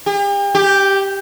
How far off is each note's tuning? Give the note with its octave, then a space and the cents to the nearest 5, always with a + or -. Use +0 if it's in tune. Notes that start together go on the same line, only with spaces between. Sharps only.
G4 +40
G4 +0